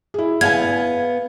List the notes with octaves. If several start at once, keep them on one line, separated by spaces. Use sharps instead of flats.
E4 G#4
B3 F5 G5 G#5 G#6